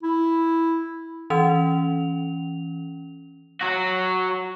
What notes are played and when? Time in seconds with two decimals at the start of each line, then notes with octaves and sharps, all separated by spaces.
0.03 E4
1.30 E3 C#4 F7
3.61 F#3 F#4